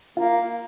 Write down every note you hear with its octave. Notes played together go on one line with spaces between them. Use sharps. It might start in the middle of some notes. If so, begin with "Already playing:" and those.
A#3 F4